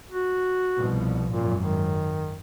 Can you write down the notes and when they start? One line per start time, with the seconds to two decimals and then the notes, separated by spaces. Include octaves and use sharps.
0.11 F#4
0.77 C2 B2 F3
1.31 G#1 F#2 A#2
1.61 D#3